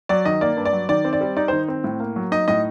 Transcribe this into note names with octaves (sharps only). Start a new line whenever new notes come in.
F#3 D5
D#3 D#5
A#3 D5
G2
D5
F#3
D#3 D5
C4
D5
G3
D#4 D5
D#3 C5
C4
A2
A#3
F#3
D#4 D#5
A2 D#5